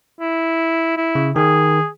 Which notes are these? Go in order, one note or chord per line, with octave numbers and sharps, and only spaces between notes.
E4
E4
C#3
D#3 G#4